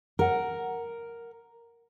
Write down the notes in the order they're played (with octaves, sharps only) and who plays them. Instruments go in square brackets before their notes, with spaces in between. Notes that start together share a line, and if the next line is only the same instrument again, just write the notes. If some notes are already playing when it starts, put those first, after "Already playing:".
[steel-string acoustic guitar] A#4 F#5